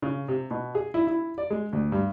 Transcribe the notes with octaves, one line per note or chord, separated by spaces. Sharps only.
C#3
C3
B2
G#4
E4
E4
D5
G#3
D2
G2